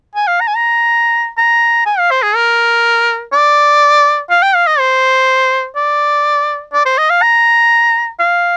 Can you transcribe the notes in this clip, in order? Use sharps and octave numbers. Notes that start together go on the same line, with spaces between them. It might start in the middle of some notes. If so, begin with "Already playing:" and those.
G#5
F5
A#5
G#5
A#5
A#5
G#5
F5
C5
G#4
A#4
D5
F5
G5
F5
D#5
C5
D5
D5
C5
D#5
F5
A#5
F5